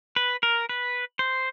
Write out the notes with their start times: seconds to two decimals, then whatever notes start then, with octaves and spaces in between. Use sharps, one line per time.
0.16 B4
0.43 A#4
0.69 B4
1.19 C5